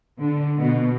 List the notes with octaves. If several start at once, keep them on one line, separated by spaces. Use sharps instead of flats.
D3
B2